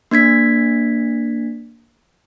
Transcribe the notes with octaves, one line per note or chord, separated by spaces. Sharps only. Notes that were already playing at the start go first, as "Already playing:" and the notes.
A#3 D4 G#6 B6